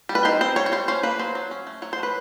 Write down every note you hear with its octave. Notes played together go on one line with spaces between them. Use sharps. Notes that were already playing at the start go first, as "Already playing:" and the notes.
G3
B4
D#4 C5
C4 C5
G3 C#5
C#5
G3 C5
C#4 C5
A#3 B4
F#3 C5
F#3
C#4
A3
F#3 C#5
C5
F#3 B4